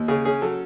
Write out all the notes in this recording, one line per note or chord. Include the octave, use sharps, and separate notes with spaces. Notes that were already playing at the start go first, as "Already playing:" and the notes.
Already playing: D#2
C#3 G#4
C#4 G#4
F#3 A4